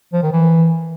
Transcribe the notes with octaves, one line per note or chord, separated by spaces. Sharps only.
F3
D#3
E3